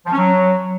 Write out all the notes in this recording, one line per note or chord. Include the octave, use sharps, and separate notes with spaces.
F3
C#4
F#3